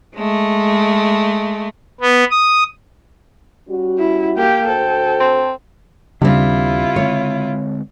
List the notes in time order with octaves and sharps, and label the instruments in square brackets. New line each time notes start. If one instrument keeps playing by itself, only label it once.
[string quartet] G#3 A3
[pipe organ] B3
D#6
[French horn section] G3 C#4 F#4
[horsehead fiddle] E4
[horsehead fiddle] A#3 G4 [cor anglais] G5
[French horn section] D2 F#4 C5 [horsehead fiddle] A4
[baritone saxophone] C4
[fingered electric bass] D#2 D4 [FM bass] C#3 [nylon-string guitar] G3 C4 [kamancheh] E4 F4
[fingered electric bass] D3 G#3 C4 [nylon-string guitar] C#5